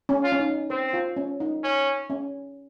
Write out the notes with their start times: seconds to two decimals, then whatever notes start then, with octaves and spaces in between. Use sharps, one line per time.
0.09 C#4
0.24 F4
0.32 C#4
0.40 D#4
0.70 C4 C5
0.93 F4
1.17 C#4
1.40 D#4
1.64 C#4
2.10 C#4